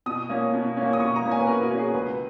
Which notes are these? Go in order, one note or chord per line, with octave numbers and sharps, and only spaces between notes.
B2 D#6
A#3 C#4
B2
A#3 C#4
D#6
B2 C#6
A#5
A#3 C#4
G#5
B4
B2 A#4
F#4
A#3 C#4
G#4
C#2 B4